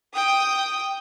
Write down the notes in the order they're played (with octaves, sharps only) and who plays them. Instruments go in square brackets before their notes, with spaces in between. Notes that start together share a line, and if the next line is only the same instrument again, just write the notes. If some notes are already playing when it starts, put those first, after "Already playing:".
[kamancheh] G5 D#6